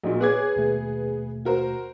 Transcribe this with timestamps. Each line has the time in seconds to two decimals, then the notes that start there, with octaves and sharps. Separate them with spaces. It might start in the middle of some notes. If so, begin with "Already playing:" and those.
0.04 A#1 A#2 F#4 D#5
0.21 B3 G#4 C#5 D6 F#6 G#6
0.56 D#2 B2 A3
1.45 F#4 A#4 C5